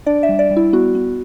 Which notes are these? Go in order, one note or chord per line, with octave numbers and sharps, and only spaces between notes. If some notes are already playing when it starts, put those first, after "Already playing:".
D4 D5
E5
G3
D5
G3
E4
B3 F#4
B3